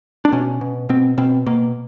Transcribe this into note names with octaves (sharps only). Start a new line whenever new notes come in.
D4
B2 C#4
B2
B2 C4
B2 C4
B2 A#3